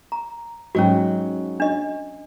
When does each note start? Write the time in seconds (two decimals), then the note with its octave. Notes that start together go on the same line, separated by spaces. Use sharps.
0.12 A#5
0.75 G#2 F#3 C#4 F#4
1.60 D4 D#5